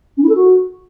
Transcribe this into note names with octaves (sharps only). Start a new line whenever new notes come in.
C#4
E4
A4
F#4